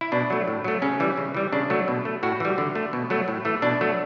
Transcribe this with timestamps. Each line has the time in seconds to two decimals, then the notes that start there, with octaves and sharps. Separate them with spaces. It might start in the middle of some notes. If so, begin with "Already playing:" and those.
0.01 E4
0.12 B2 D4
0.30 F#3 A3
0.48 A2
0.64 F#3 A3
0.82 C#3 C#4
1.00 E3 G3
1.17 C#3
1.35 E3 G3
1.53 C#3 D4
1.70 F#3 A3
1.88 B2
2.05 A3
2.23 A2 F#4
2.40 E3 G3
2.58 D3
2.75 A3
2.93 B2
3.10 F#3 A3
3.28 A2
3.45 E3 A3
3.62 B2 D4
3.81 F#3 A3